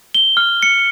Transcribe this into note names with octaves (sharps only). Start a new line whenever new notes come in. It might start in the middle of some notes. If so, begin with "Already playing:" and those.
G7
F6
C#7